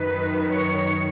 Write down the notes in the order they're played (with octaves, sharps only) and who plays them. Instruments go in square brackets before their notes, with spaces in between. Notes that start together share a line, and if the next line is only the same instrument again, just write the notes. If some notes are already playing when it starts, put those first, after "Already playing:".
Already playing: [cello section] F#2 D#3 B4
C#5